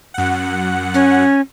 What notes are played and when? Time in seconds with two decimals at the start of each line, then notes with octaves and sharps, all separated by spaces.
0.14 F#2 F#5
0.94 C#4